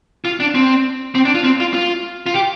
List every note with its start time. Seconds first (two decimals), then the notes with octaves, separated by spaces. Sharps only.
0.25 F4
0.40 D4
0.55 C4
1.15 C4
1.25 D4
1.35 F4
1.44 C4
1.60 F4
1.74 F4
2.26 F4
2.34 G4